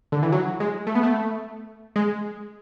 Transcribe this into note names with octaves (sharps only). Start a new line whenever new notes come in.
D3
E3
F#3
G#3
A3
B3
A3
G#3